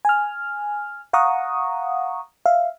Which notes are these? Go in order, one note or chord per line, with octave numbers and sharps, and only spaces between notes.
G#5 F6
F5 F#5 A#5 C#6 D#6
E5 F5